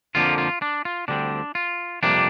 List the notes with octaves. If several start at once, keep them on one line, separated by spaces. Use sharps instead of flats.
F2 D3 F3 A#3 F4
F4
D4
F4
D2 D3 G3 C4 D4
F4
F2 C3 G3 A#3 D4